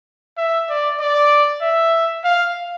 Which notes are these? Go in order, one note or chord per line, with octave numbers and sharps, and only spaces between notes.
E5
D5
D5
E5
F5